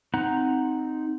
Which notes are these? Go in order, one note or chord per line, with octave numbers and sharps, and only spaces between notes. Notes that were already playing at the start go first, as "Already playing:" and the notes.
C4 D#4 F#5 A#5